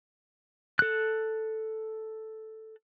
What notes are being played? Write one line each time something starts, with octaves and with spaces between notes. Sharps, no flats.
A4 F#6